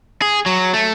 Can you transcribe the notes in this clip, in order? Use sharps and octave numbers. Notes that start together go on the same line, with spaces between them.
G#4
F#3
A3